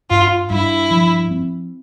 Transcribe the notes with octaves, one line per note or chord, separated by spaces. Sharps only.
G2 F4
G2 E4
F3
C4